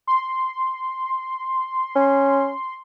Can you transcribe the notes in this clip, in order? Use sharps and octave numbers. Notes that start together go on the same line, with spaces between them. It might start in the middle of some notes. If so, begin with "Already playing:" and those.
C6
C#4